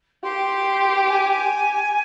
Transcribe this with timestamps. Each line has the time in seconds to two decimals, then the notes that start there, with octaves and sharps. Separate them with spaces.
0.23 G4 C6
1.08 G#5